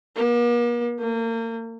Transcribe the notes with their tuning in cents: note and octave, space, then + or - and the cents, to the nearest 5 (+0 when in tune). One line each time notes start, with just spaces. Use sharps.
A#3 +45
A#3 -35